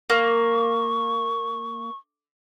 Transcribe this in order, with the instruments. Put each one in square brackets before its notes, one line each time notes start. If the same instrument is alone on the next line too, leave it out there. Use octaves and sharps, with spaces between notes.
[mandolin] A#3 [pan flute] C#6